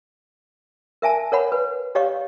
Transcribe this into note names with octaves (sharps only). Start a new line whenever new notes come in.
A#4 E5 G#5 A5
A#4 C#5 F#5 B5
B4
G4 C#5 D#5 F5 C#6